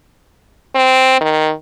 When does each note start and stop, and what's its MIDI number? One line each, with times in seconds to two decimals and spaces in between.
0.75 1.20 60
1.21 1.52 51